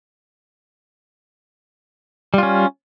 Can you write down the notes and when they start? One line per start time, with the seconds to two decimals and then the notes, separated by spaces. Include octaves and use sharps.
2.34 G3
2.38 F4
2.43 C#4